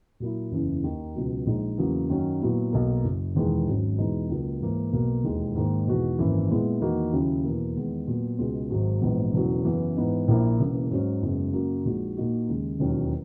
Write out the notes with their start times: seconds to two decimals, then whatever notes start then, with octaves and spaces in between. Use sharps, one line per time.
0.20 A#2 F#3 A#3 E4
0.51 F#1 E2 C#3
0.83 D#2 D#3 A#3
1.15 C#2 B2 F#3
1.46 A#1 A#2 G#3 D#4
1.78 E2 C#3 F#3 A#3
2.09 F#2 D#3 F#3 C#4
2.40 A#2 F#3 B3 E4
2.72 B1 B2 A#3
3.03 F#1 F#2 C#3
3.35 E1 E2 D#3 G#3 D#4
3.67 G#1 G#2 F#3 C#4
3.98 E2 B2 G#3 D#4
4.30 C#2 C#3 F#3 A#3
4.61 G#2 E3 A#3
4.92 B1 B2 A#3
5.24 E1 D#2 D#3 G#3 D#4
5.55 G#2 D#3 A#3
5.87 E2 B2 G#3 D#4 F#4
6.18 G#1 F#2 E3 A#3 E4
6.50 A#2 G#3 B3 E4
6.81 E2 D#3 A#3 D#4 F#4
7.13 D#2 C#3 F#3 C#4 E4
7.44 E2 B2 A#3
7.76 E2 D#3 G#3 B3
8.07 A#2 F#3 B3
8.39 C#2 B2 G#3
8.70 G#1 G#2 F#3
9.02 A#1 G#2 E3 B3
9.33 E1 E2 C#3 F#3
9.65 F#2 C#3 E3 B3
9.97 G#2 E3 B3 D#4
10.28 A#1 A#2 A#3 E4
10.59 E1 E2 C#3 E3 A#3
10.91 G#2 F#3 C#4
11.22 F#1 F#2 C#3 G#3 B3
11.53 F#2 C#3 F#3 A#3
11.85 A#1 A#2 G#3 D#4 F#4
12.17 A#2 A#3 D#4 F#4
12.48 D#2 C#3 G#3
12.79 E1 D#2 D#3 F#3 C#4